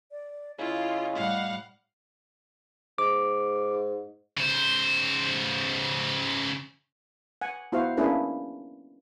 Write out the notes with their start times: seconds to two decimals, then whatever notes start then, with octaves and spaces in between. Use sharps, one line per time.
0.11 D5
0.59 C#3 E4 F4 D#5
1.15 A2 G3 F5 F#5
2.98 G#2 D6
4.37 C#3 C5
7.41 F#5 G#5
7.72 B3 E4 F#4 C5 F5
7.97 A#3 C#4 D4 E4 G#4 B4